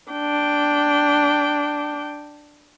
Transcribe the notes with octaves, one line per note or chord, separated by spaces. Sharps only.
D4 G5